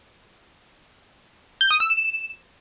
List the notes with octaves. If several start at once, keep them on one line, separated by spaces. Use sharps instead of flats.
G6
D#6
E6
E7